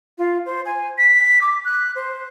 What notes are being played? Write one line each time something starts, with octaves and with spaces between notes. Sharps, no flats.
F4
C5
G#5
B6
D6
F#6
C5